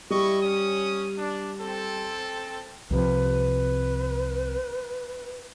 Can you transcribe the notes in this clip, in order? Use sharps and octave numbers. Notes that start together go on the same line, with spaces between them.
G3 E4 D#5 C#6
C#4 D#6
D4
C4 A4
C2 C3 F3 B4